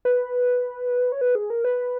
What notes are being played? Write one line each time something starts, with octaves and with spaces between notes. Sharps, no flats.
B4
C#5
B4
G#4
A#4
B4